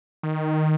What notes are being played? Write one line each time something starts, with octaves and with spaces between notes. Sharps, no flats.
D#3